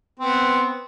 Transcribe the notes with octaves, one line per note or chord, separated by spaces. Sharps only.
B3 C4